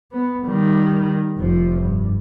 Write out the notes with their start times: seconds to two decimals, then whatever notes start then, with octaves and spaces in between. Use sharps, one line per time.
0.12 B3
0.46 D#3 G3
1.38 F1 F3
1.80 G2